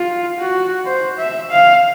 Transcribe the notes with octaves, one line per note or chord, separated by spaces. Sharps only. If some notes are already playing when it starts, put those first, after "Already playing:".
Already playing: F4
F#4
C5
E5
F5